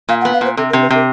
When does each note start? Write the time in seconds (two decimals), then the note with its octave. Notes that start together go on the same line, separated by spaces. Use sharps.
0.09 A#2 F5
0.21 F#5
0.25 B3
0.33 F5
0.41 A#2 C5
0.57 C3 A4
0.70 A#4
0.73 C3
0.81 B4
0.90 C3 A#4